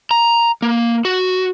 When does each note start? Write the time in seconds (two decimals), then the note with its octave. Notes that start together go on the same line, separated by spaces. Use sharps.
0.11 A#5
0.62 A#3
1.05 F#4